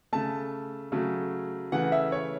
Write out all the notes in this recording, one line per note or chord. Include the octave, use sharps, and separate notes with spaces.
C#3 A3 A5
C#3 F#3 A3
C#3 E3 A3 F#5
E5
C#5